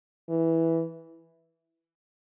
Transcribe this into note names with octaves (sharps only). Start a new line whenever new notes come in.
E3